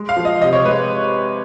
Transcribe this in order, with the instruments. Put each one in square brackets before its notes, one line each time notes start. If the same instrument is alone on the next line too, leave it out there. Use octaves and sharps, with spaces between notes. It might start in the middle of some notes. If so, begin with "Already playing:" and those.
Already playing: [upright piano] G#3
F5
F3
D#5
C3 D#5
C#5
G#3 B4